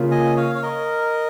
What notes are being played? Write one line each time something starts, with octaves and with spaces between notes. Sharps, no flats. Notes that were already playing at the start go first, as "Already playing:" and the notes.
Already playing: C#3 A#3 F4
D#5 G#5
C#5 F5
C#5
A#4 D#5